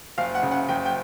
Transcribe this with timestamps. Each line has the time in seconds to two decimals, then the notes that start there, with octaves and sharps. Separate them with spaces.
0.18 F#1 F5
0.35 F#5
0.43 C#3
0.51 F#5
0.69 F#1 G5
0.86 G5